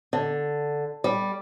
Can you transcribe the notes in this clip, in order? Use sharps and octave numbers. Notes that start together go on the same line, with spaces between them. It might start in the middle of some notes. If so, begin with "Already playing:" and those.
D3
G3